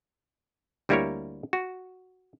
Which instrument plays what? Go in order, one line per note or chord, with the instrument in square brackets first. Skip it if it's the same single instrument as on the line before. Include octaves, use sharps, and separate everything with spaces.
[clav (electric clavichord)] D2 G3 A#3 E4 A#4 C#5
F#4